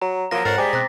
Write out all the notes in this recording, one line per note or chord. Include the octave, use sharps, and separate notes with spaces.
F#3 A#5
F3 F#3 A#3 A#5 A#6
F2 G#2 A#4 C5 C#5 F#5 A6
G3 G#3 C5 G5 G#5 D6 B6
B2 C4 A#5 F#6 A#6